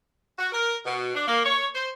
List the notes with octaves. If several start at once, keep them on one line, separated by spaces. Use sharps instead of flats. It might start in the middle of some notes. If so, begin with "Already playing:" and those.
F#4
A#4
B2
D4
A#3
C#5
C5